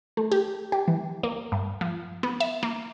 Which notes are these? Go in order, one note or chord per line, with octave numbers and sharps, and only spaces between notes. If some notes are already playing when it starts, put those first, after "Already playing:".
A3
G4
G4
E3
A#3
G2
F3
B3
E5
A#3